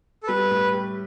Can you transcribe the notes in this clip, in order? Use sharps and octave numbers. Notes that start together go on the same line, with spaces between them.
A4
G3 B4
A2
G4